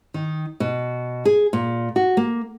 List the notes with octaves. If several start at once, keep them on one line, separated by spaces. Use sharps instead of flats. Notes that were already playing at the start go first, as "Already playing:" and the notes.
D#3
B2
G#4
A#2
F#4
A#3